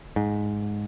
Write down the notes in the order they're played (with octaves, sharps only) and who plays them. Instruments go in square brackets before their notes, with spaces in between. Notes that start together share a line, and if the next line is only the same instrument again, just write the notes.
[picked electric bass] G#2